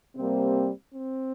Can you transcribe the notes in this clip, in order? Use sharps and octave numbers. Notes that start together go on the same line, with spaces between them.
C3 G3 A#3 C4
C4